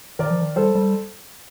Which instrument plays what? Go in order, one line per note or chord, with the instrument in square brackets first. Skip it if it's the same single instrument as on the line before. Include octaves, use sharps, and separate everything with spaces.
[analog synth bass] D#3 [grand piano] A#4 D5
[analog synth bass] F3
D#3
[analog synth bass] G3 [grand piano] A4 C5
[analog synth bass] G3